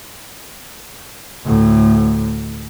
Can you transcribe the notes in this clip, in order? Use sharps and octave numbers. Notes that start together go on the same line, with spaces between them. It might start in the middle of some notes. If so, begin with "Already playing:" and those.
D2 A2